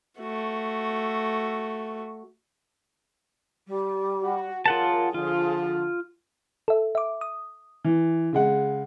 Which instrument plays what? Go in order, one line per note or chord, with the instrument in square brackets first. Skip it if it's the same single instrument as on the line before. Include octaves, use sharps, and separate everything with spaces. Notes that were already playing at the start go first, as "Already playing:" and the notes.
[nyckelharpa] A3 F#4
[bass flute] G3
[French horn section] F#4
[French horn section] F#3 A#4 [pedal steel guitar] F4 F#5 A5 [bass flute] G#4
[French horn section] D3 F3 [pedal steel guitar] F4
[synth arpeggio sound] A4 E5
E5 D6
D#6
[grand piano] E3
C#3 G#3 F#5